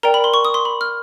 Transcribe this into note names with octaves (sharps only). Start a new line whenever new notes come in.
A#4 D5 G5 A#5
B5
C6
C#6
D#6
C6
B5
F6